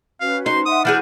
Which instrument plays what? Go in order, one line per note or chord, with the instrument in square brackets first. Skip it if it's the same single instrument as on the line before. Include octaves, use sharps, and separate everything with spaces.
[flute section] C#4 F#4 B4 [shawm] F5
[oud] D#4 C5 [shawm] C6
[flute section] E5 F#5 C6 [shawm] D#6
[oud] E3 F#4 G#4 [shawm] D4 [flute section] F6 G6